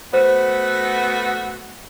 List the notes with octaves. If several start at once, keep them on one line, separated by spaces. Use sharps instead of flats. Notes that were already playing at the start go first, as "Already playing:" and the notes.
A3 B3 F#4 C5